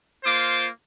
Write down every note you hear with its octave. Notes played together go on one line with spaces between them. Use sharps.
A#3 F4 C5 D6